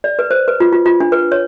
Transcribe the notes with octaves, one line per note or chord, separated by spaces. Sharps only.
D5
B4
C5
B4
F4
F4
F4
D4
B4
C#5